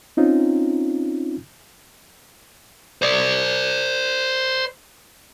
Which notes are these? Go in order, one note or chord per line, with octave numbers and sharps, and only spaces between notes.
C4 C#4 D#4 F4
C5 D5